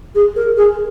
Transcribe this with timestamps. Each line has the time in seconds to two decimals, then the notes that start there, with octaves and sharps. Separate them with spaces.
0.15 G#4
0.36 A#4
0.57 G#4